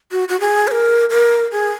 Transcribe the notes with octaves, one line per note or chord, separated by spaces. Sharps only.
F#4
F#4
G#4
C#5
A#4
A#4
G#4